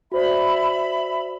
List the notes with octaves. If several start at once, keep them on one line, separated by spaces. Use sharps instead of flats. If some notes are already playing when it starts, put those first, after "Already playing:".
F#4 C5 D5 E5 B5